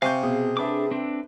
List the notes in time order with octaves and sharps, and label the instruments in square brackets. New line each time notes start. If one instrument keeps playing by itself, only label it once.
[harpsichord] C3 [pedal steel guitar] F5 [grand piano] G#5 C#6 G6
[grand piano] B2 [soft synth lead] G#4
[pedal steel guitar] D4 D6 [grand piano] A4 B4 E5
[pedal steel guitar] C4 D4